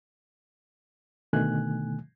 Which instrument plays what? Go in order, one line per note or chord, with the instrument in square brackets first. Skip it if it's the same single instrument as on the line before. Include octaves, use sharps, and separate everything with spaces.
[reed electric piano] B2 D3 D#3 A3 G#5 F#6